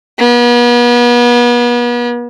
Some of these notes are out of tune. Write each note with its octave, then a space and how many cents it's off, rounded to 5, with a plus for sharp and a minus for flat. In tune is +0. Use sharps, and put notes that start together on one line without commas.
B3 -40